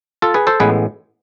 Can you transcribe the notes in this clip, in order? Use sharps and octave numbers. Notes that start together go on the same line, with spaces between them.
F4 A4
G#4 B4
A4 C5
A1 A2 G#3 B3 G#4 B4